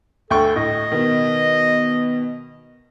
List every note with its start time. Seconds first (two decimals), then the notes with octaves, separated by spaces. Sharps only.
0.31 D2 A4 G5 C#6
0.56 A2 D#5
0.91 B2 D#3